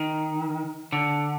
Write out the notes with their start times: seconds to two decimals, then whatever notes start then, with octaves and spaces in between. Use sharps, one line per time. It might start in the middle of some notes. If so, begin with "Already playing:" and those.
Already playing: D#3
0.92 D3